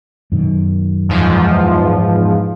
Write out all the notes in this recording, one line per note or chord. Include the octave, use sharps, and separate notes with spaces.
F#2 B2 D#3
E2 G#2 F3